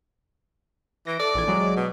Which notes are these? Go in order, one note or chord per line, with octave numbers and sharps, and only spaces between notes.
E3 A#6 D7
A4 D5 D6
A#1 E3 G#6
F#3 G#3
B2